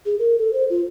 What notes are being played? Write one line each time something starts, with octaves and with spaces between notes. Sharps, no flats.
G#4
A#4
A4
C5
F4